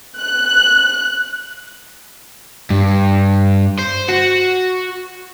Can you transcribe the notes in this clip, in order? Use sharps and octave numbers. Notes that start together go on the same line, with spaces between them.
F#6
G2
C5
F#4